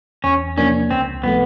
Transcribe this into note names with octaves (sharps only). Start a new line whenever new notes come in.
E2 C#4
C3 F3 A#3 C#4 D4
C#2 C4
C3 F3 A3 B3